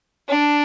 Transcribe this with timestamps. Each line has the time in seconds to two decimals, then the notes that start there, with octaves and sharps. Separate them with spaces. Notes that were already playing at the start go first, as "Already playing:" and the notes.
0.29 D4